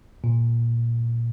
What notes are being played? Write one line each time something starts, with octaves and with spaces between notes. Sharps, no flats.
A#2